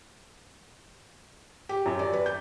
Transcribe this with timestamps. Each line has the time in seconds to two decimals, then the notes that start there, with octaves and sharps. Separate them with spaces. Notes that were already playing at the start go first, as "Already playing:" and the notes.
1.69 G4
1.86 F#2
1.99 D5
2.13 B4
2.26 G6